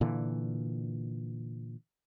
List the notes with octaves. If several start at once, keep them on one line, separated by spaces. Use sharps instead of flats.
A#2 D3 E3